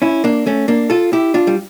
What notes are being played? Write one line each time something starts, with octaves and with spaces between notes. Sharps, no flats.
C#4 E4
A#3 D4
A3 C#4
A#3 D4
F4 A4
E4 G4
D4 F4
G3